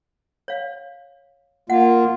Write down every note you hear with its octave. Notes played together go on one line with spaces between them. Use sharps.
C#5 F5
A#3 F4 F#5